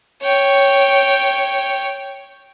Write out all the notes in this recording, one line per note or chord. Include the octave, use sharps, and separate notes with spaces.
C#5 G5